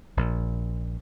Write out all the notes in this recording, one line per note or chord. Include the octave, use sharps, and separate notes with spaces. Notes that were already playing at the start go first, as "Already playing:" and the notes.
A#1